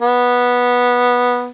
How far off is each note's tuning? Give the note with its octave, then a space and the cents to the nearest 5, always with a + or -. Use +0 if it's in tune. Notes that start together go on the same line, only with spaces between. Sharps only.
B3 -10